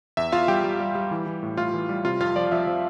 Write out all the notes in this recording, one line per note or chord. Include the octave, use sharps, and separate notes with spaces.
E2 E5
E2 F4 F5
G3 G4 G5
G3
G3
G3
E3
E3
A2
A2 F4 F5
E3
G3
C3 F4 F5
F2 F4 F5
F3 D5
F3 E5
F3